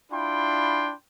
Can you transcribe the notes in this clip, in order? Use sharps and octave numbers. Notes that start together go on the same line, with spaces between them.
D4 E4 F4 G5 B5 C6